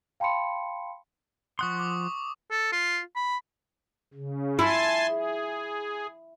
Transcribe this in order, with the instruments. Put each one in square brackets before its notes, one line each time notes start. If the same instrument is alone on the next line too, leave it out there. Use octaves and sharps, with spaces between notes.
[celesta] F5 G5 A5 B5 C6 C#7
[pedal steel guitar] F3 F#5 C6 [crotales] C#6 D#6
[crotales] D6
[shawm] A4
F4
B5
[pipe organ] C#3
[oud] E4 [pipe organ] G#5 A5 C6
[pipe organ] G#4